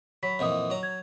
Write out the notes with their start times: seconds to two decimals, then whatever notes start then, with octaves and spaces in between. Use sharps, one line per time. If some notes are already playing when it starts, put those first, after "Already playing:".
0.23 F#3 B5 B6
0.39 F2 A#2 E3 D#5 F#5 D#6
0.70 F#3 A#5
0.83 G#6